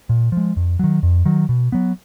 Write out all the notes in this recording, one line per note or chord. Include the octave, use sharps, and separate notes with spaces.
A#2
F3 G#3
F2
D#3 F#3
F2
D#3 F#3
B2
F#3 B3